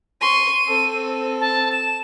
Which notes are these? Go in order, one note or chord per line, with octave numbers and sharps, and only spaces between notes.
C6 C#6 D#7
C4 A4
A5
E7